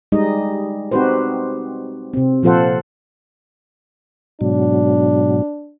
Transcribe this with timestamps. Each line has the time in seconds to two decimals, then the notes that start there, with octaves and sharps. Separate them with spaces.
0.12 G3 G#3 D#4 D#5
0.91 C4 D#4 F#4 G4 B4 C5
2.13 C3 C4
2.43 A#2 F3 F4 A4 C5 F#5
4.41 G#2 B2 F#3 D4